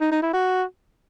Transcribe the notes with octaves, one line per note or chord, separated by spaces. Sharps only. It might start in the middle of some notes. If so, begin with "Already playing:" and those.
D#4
D#4
E4
F#4